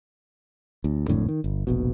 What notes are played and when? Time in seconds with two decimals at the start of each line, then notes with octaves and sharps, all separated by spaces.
0.84 D2
1.08 F#1 F2 A2 D3
1.29 D#3
1.44 G1
1.67 F1 A#1 B2